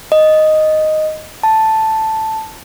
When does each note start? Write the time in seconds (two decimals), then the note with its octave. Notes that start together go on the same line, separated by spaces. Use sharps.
0.12 D#5
1.43 A5